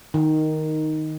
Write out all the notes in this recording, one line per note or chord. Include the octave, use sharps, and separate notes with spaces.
D#3